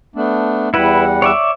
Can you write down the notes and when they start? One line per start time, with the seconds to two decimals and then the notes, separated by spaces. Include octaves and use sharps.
0.16 A3 B3 D4
0.74 E2 G3 E4 B4 F#5
1.22 C#5 D5 E5